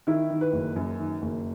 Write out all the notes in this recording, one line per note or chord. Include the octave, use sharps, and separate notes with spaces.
D#3 E4
D#3
B4
F#1
F#2
D#3
F#1